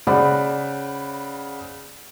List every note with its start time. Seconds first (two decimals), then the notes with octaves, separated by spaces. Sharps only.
0.07 C#3 C5 D5 F#5 B5